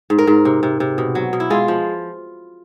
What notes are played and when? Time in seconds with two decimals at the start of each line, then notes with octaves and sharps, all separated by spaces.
0.10 G#2
0.18 A#4
0.27 G#2
0.45 C3
0.63 C3
0.80 C3
0.98 B2
1.15 F#3
1.33 B2
1.40 E4
1.50 G#3 F4
1.68 F3